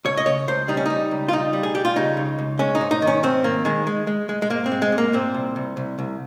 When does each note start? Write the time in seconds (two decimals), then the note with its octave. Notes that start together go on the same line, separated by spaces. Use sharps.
0.05 C#2 C#5
0.17 D#5
0.26 C#3 C#5
0.48 C#2 C5
0.68 G3 D#4
0.77 C#4
0.86 G3 D#4
1.11 C#2
1.28 F4
1.32 G3 D#4
1.53 G3
1.63 G#4
1.75 G3 G4
1.85 F4
1.96 C#3 D#4
2.17 C#2
2.39 C#2
2.59 G#3 C#4
2.75 D#4
2.81 G#2
2.91 D#4
3.02 D#3
3.07 C#4
3.23 G#2 C4
3.44 D#3 A#3
3.65 D#3 G#3
3.87 G#3
4.07 G#3
4.29 G#3
4.42 G#3
4.50 G#2 A#3
4.66 C4
4.72 G#3
4.82 G#3
4.92 G#2
4.98 A#3
5.13 A#2 C4
5.34 C2
5.56 C2
5.77 C2
5.99 C2